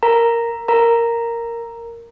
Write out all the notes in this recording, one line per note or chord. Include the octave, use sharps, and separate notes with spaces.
A#4 A#5
A#4 A#5